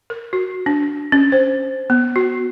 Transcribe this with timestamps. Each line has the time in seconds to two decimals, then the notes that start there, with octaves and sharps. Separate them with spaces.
0.10 A#4
0.33 F#4
0.66 D4
1.12 C#4
1.32 C5
1.90 B3
2.16 F#4